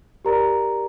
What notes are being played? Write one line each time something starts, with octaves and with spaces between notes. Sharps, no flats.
G4 A#4 D5 A#5